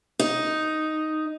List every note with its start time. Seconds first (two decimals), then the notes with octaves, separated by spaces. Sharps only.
0.19 D#4